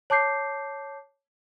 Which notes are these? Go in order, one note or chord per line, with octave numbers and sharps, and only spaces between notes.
C#5 A5 D6 G6 C7